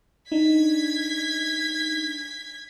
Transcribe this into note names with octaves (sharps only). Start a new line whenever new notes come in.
D4 D#4 G#6 B6